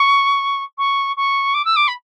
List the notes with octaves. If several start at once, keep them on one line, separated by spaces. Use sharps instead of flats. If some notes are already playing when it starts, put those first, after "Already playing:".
Already playing: C#6
C#6
C#6
D6
E6
D6
B5